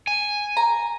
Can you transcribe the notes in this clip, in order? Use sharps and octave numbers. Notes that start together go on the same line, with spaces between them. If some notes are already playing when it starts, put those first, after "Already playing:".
G#5
A#5